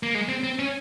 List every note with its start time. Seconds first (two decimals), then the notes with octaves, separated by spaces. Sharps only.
0.03 A#3
0.15 G#3
0.29 C4
0.44 C4
0.59 C#4